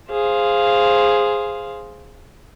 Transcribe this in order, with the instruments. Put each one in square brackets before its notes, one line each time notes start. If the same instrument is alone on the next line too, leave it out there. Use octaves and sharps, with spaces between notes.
[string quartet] G#4 C5 F5